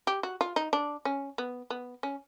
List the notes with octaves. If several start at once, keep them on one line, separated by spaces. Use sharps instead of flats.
G4
F#4
F4
D#4
D4
C#4
B3
B3
C#4